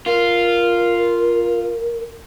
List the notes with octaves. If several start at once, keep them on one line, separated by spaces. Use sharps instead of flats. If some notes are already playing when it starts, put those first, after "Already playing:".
F4 A#4